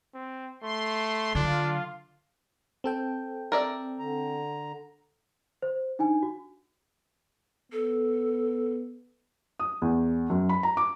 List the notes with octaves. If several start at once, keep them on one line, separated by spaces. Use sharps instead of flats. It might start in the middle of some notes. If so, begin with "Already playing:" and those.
C4
A3 C6
D3 F#3 D4 F4
C4 A4 G5
A#4 D5 E5
D3 A#5
C5
D4 D#4 G#5
F#4
B3 A4
D#6
E2
F#2
B5
A#5
D6